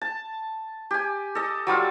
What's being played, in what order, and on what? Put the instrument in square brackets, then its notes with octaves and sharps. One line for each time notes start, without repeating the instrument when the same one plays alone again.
[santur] A5
G4 G#5
A4 D#5
F#3 G3 F4